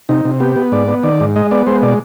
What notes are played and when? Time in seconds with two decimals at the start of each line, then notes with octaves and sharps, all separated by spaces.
0.09 C3 D#4
0.25 C3
0.40 B3 G4
0.56 B3
0.72 G#2 D5
0.88 B3
1.03 D#3 D5
1.20 G#2
1.36 G#3 D#5
1.51 B3 D5
1.66 G#3 C5
1.82 B2 D5